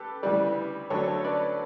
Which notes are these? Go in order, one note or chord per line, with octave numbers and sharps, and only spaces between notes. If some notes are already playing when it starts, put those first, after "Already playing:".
Already playing: G4 A4 B4
D2 C#3 E3 G3 B4 D5
D2 D3 F#3 A4 C#5
A4 C#5
B4 D5